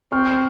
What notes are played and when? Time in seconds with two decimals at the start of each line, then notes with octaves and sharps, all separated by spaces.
0.12 C4 C#6 F6